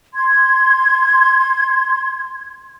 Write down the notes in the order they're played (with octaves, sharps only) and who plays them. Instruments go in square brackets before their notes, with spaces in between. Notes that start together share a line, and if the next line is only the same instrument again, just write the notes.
[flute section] C6 G#6